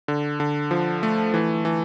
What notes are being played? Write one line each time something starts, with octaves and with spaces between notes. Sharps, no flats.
D3
D3
F3
A3
E3
E3